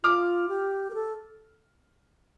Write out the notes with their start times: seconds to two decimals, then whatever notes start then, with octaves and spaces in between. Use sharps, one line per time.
0.04 F4 D6 F6
0.49 G4
0.90 A#4
0.94 A4